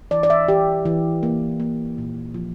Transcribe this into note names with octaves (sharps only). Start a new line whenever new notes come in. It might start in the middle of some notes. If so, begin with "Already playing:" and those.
E3 D5
D5
E5
E3 G4
E3
A#3
A#3
A#2
F3